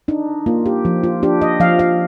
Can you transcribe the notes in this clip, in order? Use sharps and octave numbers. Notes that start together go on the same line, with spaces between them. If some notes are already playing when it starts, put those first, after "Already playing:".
D4 D#4
A#3 F4
G4
F3
F4
D4 G4
D#5
F3 F5
F5